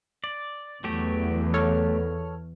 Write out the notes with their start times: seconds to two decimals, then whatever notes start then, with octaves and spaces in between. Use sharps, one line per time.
0.24 D5
0.84 E2 F#3 A3 G4
1.54 A4 C#5 F6